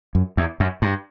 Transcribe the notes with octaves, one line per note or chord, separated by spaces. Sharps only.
F#2
E2
F#2
G2